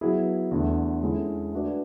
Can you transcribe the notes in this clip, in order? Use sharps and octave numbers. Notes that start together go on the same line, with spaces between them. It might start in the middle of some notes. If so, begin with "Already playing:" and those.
F#3 B3 E4 G#4
E2 D3 A3
D3 G#3 C#4 E4 A4
A3 D4 F#4 B4 D5